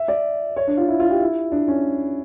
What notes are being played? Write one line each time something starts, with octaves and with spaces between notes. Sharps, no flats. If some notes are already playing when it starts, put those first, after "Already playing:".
Already playing: E5
D5
C#5
D4
F4
E4
F4
G4
E4
D4
C#4